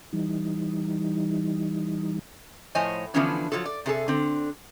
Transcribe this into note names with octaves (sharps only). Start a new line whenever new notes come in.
E3 G3 D#4
A2 F3 C5 C#5 D#5 G#5
D3 E3 F3 B3 C#4 D4
F3 F#3 G#3 F4 A4
D5
C3 G#4 A4
D3 C4